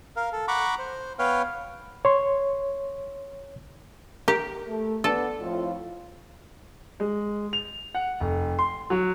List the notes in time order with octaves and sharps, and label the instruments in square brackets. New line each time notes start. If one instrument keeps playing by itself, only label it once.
[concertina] A#4 F5
A4
F#5 A#5 B5 C#6 D6
C5
B3 B4 C#5 F5 G5 F6
[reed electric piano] C#5 C6
[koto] G4 [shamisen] A#4
[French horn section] A3 A4
[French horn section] B3 D4 [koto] A4
[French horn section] F2 A2 F4
[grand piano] G#3
F7
F#5
F1
C6
F#3